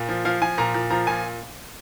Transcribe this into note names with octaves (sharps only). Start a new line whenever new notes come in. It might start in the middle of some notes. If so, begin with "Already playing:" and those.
Already playing: A#2
F3
F3 F5
F3 G#5
A#2 A#5
A#2
F3 A#5
A#2 G#5